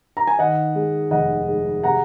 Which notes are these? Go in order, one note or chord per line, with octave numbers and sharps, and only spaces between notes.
A#5
G#5
D#3 D#5 F#5
G#3
F1 D#5 F#5
G#3
C3 F#5 A#5